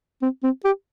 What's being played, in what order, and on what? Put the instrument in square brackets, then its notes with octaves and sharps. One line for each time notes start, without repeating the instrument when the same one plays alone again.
[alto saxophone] C4
C4
G4